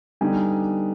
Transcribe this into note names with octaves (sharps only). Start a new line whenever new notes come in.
D3 G3 B3 D#4 G#5